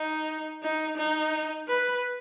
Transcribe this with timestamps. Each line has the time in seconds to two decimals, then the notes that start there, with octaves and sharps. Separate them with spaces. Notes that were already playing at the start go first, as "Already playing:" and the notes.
Already playing: D#4
0.63 D#4
0.97 D#4
1.68 B4